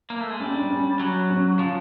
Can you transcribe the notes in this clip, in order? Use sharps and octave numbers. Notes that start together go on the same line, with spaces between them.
A#3
A3
G#3
G3 C#4
D4
C#4
F#3
C#4
F3